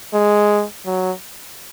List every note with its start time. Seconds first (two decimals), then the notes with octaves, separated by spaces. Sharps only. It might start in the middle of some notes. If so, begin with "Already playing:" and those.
0.13 G#3
0.86 F#3